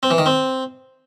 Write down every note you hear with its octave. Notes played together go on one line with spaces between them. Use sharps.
C4
E3
D#3
C4